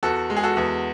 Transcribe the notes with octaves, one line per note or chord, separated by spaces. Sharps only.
E2 F#4 A4
G#3
G#4
F#4 A4
E2